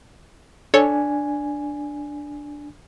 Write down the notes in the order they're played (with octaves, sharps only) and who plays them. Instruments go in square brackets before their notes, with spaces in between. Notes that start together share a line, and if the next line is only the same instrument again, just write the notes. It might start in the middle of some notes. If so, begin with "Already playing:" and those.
[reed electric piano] D4 G#5 [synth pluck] A4 C#5